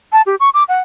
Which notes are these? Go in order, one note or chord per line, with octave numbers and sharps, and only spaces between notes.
A5
G4
C#6
D6
F#5